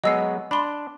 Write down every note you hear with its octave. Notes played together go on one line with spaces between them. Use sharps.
F#3 G#3 B3 D#5 E6 C7
D4 B5 C6